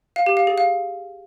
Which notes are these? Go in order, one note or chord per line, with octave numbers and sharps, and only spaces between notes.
F5
G4
F5
G#4
F5